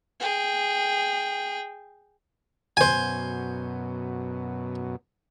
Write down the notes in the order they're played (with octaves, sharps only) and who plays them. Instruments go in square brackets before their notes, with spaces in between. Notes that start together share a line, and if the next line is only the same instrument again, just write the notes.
[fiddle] G#4 G5
[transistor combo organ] F#2 B2 [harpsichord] C5 G#5